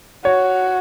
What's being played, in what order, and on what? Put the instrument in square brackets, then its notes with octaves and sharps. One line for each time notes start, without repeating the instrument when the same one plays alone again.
[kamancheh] F#4 [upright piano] C#5